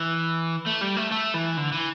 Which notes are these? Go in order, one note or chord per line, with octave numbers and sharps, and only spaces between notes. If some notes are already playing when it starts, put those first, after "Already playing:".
Already playing: E3
A3
G3
A3
A3
E3
D3
E3